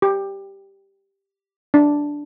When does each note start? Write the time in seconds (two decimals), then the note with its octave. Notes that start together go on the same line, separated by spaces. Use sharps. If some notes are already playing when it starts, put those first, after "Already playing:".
0.02 G4
1.74 D4